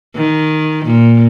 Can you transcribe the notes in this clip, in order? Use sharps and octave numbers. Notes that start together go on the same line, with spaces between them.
D#3
A#2